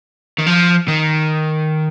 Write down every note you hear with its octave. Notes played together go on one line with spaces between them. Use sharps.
D#3
F3
D#3